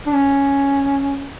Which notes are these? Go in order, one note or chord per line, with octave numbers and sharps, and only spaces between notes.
D4
C#4